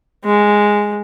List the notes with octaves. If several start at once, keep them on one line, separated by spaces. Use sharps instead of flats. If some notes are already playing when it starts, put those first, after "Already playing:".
G#3